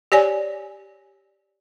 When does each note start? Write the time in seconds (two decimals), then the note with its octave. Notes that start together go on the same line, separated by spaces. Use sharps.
0.12 G4 C#5 D5 G#5